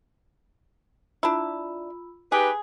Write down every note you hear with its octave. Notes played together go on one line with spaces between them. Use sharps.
D4 E4 F4 B5 E6
D#4 G4 G#4 B4